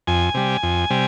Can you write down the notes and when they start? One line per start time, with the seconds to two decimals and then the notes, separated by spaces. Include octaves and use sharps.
0.07 F2 G#5
0.34 C3 G3
0.63 F2
0.90 C3 G3